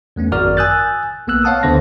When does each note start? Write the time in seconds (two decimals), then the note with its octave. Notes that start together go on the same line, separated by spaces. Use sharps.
0.16 E2 A3 B3 C#4
0.32 G#1 F#2 F#4 A#4 D5 F6
0.57 G#5 D#6 E6 F#6 G6 A6
1.27 B1 A#3 B3 E6 F#6
1.44 C#5 F5 F#5 A5 D#6
1.63 D2 D3 B3 C5 E5 A#6